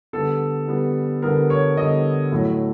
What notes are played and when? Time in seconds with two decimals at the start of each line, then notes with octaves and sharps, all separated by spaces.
0.13 D3 G3 B3 A4
0.68 D3 G3 B3
1.22 D3 G3 B3 A#4
1.50 C#5
1.77 D3 G3 B3 D#5
2.32 A2 F#3 A3